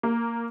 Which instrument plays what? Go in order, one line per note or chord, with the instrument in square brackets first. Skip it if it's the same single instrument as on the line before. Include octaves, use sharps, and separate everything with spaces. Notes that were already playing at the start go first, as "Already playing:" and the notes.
[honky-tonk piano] A#3